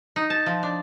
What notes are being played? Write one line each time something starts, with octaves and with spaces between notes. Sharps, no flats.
D#4
A5
F3
D4